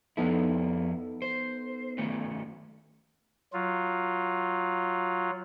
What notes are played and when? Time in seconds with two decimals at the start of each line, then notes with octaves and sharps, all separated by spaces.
0.17 F2 F3 B3 D#4 E4 A4
1.22 C5
1.98 D#3 A3 C#4
3.53 F#3 F4